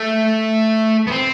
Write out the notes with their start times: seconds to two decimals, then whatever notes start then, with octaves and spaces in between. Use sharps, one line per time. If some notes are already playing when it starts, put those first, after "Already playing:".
Already playing: A3
1.07 B3
1.11 C4